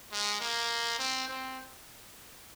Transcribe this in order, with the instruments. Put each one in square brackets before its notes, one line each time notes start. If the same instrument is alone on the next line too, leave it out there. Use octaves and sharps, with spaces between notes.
[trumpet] G#3
A#3
C4
C4